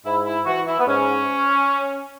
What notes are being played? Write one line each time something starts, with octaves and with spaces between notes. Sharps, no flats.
G#2 E4
E4
E3 F#4
E4
B3
G#2 C#4